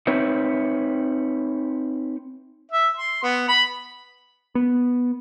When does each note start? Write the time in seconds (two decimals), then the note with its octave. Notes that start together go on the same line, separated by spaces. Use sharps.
0.07 C4 D#4 B4 C#5 E5
2.72 E5
2.97 C6
3.23 B3
3.48 B5
4.55 B3